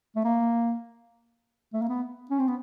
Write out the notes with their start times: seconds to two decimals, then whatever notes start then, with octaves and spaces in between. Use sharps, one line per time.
0.16 A3
0.24 A#3
1.73 A3
1.82 A#3
1.89 B3
2.30 C#4
2.39 C4
2.48 B3